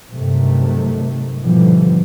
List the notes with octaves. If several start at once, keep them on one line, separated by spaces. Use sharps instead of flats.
G2 C3 D#3 F#3 A3
G#2 B2 D3 E3 F3 G3